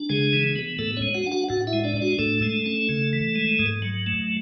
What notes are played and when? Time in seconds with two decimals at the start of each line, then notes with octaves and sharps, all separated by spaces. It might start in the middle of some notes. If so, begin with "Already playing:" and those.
Already playing: D4
0.09 C#3 G#3 G#4
0.33 E3
0.56 B3
0.79 A2 A3 A4
0.97 C#4 C#5
1.02 G#3
1.14 F#4 F#5
1.26 D4
1.32 F#4 F#5
1.49 A2 F#4 F#5
1.67 E4 E5
1.73 G#3
1.84 D4 D5
1.96 D4
2.02 F#4
2.19 A2 A3 A4
2.42 G#3
2.66 C#4
2.89 C#3
3.13 E3
3.36 G#3
3.59 G#2
3.82 F#3
4.06 A3